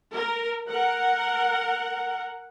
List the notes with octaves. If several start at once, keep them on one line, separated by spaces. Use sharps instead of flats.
A#4
A#4 F#5